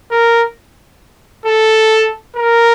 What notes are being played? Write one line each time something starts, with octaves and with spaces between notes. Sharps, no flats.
A#4
A4
A#4